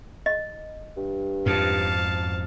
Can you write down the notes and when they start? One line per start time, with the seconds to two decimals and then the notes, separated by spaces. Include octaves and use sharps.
0.26 D#5
0.97 G2
1.46 F2 G#2 F5 A5